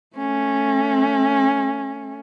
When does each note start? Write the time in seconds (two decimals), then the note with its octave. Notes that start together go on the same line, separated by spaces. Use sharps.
0.16 A3 C#4